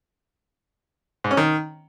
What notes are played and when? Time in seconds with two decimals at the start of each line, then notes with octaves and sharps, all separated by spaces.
1.24 G#2
1.31 C#4
1.37 D#3